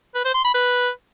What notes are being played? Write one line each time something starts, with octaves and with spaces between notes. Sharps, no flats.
B4
C5
C6
B5
B4